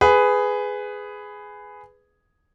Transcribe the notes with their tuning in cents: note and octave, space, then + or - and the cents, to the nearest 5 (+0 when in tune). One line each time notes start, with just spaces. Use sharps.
G#4 +0 B4 +15